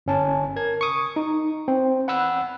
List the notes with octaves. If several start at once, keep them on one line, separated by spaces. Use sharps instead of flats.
G1 C#4 A5
A#4 G#6
C#6 D#6
D#4
C4
F#5 B5 E6 F#6